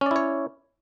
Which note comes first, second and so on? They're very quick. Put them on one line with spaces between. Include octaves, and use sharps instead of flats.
C#4 D5 E4 C#5